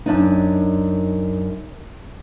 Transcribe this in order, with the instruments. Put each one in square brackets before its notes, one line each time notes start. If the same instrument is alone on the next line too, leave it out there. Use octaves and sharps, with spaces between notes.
[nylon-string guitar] F#2 D4 D#4